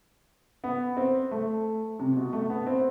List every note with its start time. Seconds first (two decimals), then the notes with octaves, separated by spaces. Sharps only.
0.64 B3
0.97 C4
1.31 A3
1.99 C3
2.16 B2
2.33 A3
2.50 B3
2.67 C4